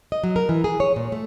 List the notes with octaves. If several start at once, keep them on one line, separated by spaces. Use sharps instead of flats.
D#5
F#3
A#4
E3
G#4
C#5
A#2
A3